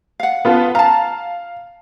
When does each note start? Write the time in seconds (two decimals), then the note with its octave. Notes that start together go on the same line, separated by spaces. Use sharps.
0.20 F5 F#5
0.45 B3 F4 A5
0.75 F5 A5 A#5